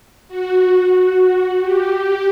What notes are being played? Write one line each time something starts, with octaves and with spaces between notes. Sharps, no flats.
F#4
F#4
G4
G4